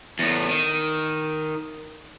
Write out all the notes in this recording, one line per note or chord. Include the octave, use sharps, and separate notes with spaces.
E2 A2
D#3